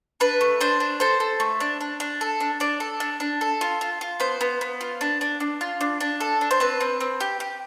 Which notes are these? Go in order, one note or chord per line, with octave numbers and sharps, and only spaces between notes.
D4 B4
A3
D4 C5
D4
A4 C5
A4
A3
D4
D4
D4
A4
D4
D4 D5
A4
D4
D4
A4
F4
F4
F4
B3 C5
B3
B3
F4
D4
D4
D4
F4
D4
D4
A4
D4
C5
C4 B4
C4
C4
G4
G4